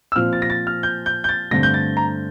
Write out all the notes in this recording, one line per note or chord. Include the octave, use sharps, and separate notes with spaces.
E6
A#2 F3 C4 F6
A6
A#6
A6
F6
G6
G6
G6
A6
G2 D3 A3 C4 A#6
G6
A6
A#5